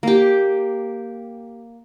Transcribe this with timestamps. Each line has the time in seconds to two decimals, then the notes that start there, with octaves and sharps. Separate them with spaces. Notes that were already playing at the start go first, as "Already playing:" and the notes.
0.03 A#3 G4